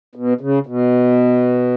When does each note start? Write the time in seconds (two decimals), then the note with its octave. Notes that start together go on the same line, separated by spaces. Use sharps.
0.15 B2
0.41 C#3
0.67 B2